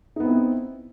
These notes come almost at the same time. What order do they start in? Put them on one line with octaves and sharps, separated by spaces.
D#4 B3 C4 E4